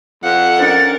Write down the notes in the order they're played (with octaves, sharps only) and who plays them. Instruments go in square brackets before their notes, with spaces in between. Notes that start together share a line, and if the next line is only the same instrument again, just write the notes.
[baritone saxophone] F2 [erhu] F#5
[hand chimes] C#4 D4 C5 [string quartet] A#4 A6